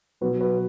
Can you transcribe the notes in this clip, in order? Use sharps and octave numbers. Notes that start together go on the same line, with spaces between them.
B1 B2 F#3 F#4 B4
F#4 B4